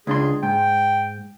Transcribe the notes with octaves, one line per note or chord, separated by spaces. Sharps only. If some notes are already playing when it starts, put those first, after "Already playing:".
C#2 D4 G#4 C6
G#2 G5